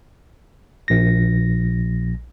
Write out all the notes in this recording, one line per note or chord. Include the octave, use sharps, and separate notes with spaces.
A#1 A#6